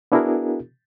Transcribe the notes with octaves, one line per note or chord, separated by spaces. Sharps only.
B3 D4 E4 F#4 G#4 A#4